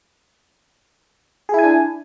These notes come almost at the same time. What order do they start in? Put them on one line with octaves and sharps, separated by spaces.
G#4 E4 G#5 D4